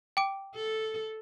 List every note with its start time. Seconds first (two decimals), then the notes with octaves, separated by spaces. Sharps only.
0.17 G5 D6 D7
0.55 A4